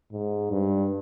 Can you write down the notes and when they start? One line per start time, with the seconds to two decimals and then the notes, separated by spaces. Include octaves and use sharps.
0.12 G#2
0.51 G2